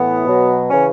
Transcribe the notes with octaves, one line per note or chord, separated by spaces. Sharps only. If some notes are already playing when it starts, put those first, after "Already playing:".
Already playing: A2 E3 B3
B2 F#3
C#3 E3 C#4